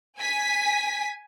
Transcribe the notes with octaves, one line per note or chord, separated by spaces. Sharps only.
G#5 B6